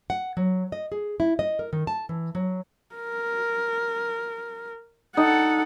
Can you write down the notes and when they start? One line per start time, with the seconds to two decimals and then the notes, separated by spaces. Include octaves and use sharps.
0.10 F#5
0.37 F#3
0.72 D#5
0.92 G#4
1.20 E4
1.39 D#5
1.59 A#4
1.73 D#3
1.87 A5
2.09 E3
2.35 F#3
2.95 A#4
5.17 D#4 A4 F#5